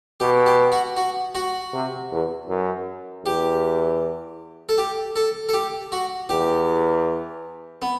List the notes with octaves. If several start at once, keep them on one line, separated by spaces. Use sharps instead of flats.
B2 G4
G4
F#4
F#4
F#4
C3
E2
F#2
E2 G4
A4
G4
A4
A4
G4
F#4
E2 G4
B3